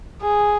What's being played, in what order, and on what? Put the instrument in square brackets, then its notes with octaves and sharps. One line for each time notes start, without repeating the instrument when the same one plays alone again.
[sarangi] G#4